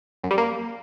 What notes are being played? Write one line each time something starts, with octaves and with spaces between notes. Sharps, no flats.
F#2
G3
A#3